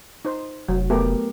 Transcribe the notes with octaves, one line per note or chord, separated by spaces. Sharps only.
D#4 C5
F1 F#3
A3 B3 G4 A#4